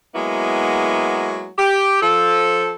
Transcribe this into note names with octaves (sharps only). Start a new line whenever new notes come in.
F#3 G#3 A#3 B3 E4
G4
F3 A4